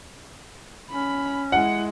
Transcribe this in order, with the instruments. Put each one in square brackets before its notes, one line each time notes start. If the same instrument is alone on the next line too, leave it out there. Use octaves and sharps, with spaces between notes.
[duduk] C#4 [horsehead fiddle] B5
[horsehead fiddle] G#3 E4 [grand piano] F#5